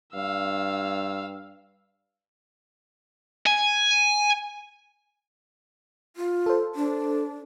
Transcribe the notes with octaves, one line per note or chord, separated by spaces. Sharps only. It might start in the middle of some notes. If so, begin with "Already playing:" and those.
G2 F5 E6
G#5
F4
A4 C5
D4